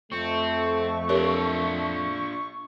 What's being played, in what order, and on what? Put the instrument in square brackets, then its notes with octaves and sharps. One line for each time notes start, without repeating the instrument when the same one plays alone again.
[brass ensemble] F2 A3 [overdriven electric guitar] C4 [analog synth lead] C#6
[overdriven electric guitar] D4 F4 [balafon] G4 A#4 C#5